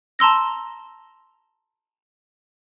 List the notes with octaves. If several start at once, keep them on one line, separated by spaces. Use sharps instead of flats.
A5 A#5 C6 E6 A#6